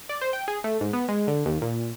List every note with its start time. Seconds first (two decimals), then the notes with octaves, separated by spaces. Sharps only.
0.09 D5
0.21 C5
0.33 G5
0.48 G#4
0.64 A3
0.81 G#2
0.93 B3
1.08 G#3
1.27 D3
1.46 D#2
1.62 A#2